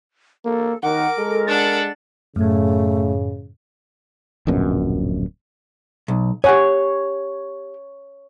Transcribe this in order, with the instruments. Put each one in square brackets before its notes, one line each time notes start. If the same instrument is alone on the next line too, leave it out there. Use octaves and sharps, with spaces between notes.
[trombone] A#3 [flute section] A4
[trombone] D#3 [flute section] A#4 [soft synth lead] F#5 [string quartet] D6
[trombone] G#3 [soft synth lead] A4
[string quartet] D4 A4 F#5 [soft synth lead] A6
[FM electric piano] F#2 A2 [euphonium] C#3 [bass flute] A3
[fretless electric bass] D1 A#1 F#2 B2
[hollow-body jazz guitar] B1
[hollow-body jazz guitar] G4 F#5 G#5 [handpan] C#5